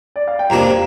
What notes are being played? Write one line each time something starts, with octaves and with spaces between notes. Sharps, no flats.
D5
F5
G5
F2 C3 A#3 D4 A#5